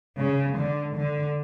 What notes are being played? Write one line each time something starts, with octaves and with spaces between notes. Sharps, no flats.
C#3
D3
D3